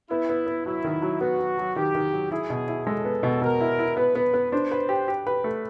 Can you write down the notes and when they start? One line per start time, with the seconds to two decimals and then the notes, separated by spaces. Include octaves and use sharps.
0.10 B3 E4
0.29 B3
0.47 B3
0.66 F#3 E4
0.84 D#3
1.02 F#3
1.20 B3 F#4
1.39 F#3
1.58 F#3
1.76 D#3 G4
1.95 D#3
2.13 F#3
2.32 E4 G#4
2.50 B2
2.68 E4
2.86 G#3 A4
3.05 B3
3.23 B2
3.42 B2 A#4
3.61 E4
3.79 E4
3.97 B3 B4
4.15 B3
4.34 B3
4.52 D4 C5
4.72 B4
4.89 G4
5.08 G4
5.27 B4
5.44 A3